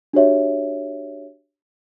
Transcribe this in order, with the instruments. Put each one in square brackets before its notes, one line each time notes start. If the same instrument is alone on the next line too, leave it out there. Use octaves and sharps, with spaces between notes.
[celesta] D4 F#4 G4 C#5 E5